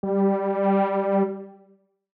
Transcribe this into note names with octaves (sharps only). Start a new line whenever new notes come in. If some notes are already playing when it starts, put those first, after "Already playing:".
G3